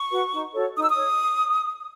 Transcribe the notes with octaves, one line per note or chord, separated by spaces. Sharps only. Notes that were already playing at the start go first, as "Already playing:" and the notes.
Already playing: C#6
F#4 B4
D#4
F#4 A4 C#5
D#4 D#6
E6
D#6
C#5